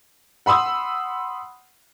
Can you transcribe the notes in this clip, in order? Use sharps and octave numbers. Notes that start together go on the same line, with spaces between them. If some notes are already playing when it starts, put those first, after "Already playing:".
F#5 B5 C6 D#6 E6